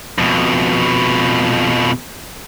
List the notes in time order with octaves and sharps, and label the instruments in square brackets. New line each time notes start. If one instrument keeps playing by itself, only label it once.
[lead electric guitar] F2 B2